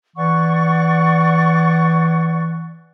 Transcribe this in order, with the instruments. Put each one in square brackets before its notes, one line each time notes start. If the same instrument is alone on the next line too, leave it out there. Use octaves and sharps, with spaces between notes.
[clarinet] E3 [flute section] D5 F#5 C#6